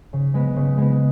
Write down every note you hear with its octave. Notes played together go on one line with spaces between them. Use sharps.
C#3
G#3 B3
C#3
G#3 B3